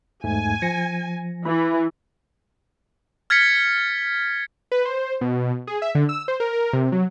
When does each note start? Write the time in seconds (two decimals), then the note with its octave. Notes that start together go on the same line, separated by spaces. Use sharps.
0.24 E2 G#2 A3 G#5
0.62 F3 A#6 C#7
1.45 E3 B5
3.30 F6 G#6 A6 B6 C#7
4.72 B4
4.85 C5
5.21 B2
5.67 G#4
5.82 E5
5.95 D3
6.09 E6
6.28 C5
6.40 A#4
6.53 A#4
6.73 C3
6.92 F#3